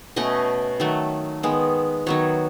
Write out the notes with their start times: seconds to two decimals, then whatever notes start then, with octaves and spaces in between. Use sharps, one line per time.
0.16 B2 A3 C#4 D#5
0.80 D#3 F#3 A3
1.43 D#3 G#3 B3
2.06 D#3 F#3 B3 C#5